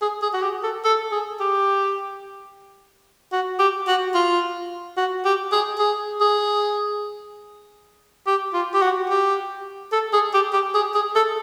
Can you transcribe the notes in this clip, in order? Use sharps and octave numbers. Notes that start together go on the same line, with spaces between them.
G#4
G#4
F#4
G4
A4
A4
G#4
G4
F#4
G4
F#4
F4
F#4
G4
G#4
G#4
G#4
G4
F4
G4
F#4
G4
A4
G#4
G4
G4
G#4
G#4
A4